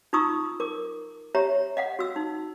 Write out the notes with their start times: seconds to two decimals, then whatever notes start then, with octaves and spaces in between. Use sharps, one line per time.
0.13 D#4 F4 A#5 C#6 D#6 E6
0.60 A#4 D6
1.35 G4 C#5 E5 A#5
1.77 D#5 F5 F#5
1.99 F#4 E6
2.16 D#4